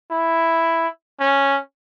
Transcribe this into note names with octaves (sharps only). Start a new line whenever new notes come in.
E4
C#4